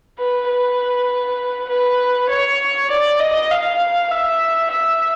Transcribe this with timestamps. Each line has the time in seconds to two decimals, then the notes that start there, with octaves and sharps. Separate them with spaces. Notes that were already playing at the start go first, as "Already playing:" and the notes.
0.18 B4
0.48 B4
1.69 B4
2.29 C#5
2.90 D5
3.20 D#5
3.51 F5
4.11 E5
4.72 E5